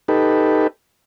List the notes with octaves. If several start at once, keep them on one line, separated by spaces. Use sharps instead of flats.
D#4 G4 A4 B4